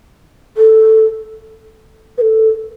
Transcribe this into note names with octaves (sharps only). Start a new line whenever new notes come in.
A4
B4
A4